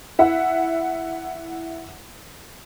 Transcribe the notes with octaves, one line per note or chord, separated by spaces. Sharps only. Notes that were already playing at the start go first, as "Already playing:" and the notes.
E4 E5 F#5